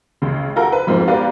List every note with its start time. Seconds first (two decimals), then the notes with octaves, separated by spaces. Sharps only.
0.22 C#2 C#3
0.56 F4 G4 A4 A#4 F#5
0.72 B4
0.87 F2 G#2 F3 A#3 C4
1.08 B3 G4 A#4 B4 D5 F5